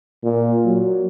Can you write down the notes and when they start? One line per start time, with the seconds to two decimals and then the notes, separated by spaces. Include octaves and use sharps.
0.24 A#2
0.65 F#3